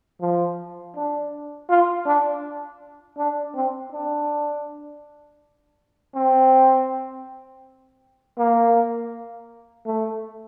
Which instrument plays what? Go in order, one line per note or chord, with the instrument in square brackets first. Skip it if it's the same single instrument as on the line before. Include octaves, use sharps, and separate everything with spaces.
[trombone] F3
D4
F4
D4
D4
C4
D4
C4
A#3
A3